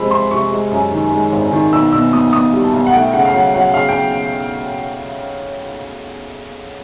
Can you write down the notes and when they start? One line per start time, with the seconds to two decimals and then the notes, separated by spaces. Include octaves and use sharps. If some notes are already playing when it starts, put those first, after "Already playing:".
Already playing: F2 C3 F3 G#3 B5 E6
0.11 G#3 C6
0.31 C3 C#6
0.51 G#3
0.72 F#2
0.92 D#3
1.12 G#3
1.32 G#1
1.52 D#3
1.73 B1 E6
1.93 B2 E6
2.13 B2 D#6
2.33 B2 D#6
2.53 G3
2.63 A5
2.73 B1
2.86 F#5
2.93 A3 G5
3.13 C#3 F#5
3.25 F5
3.34 F#3 F#5
3.54 F#3 F#5
3.74 C#3 F5
3.89 G5